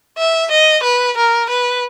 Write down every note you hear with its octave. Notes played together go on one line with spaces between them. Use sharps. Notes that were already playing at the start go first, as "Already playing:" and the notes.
E5
D#5
B4
A#4
B4